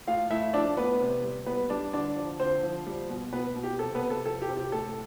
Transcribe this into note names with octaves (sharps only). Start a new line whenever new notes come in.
A2 F4 F5
A3 E4 E5
F3 D4 D5
A2 B3 B4
C3
G3
G3 B3 B4
G3 D4 D5
D3 D4 D5
F3
D3 C4 C5
F3
G3
B2
B2 B3 B4
B2
G4
C3 A4
B3 B4
C3
A4
F3 A4
G4
C3
G4
A2 A4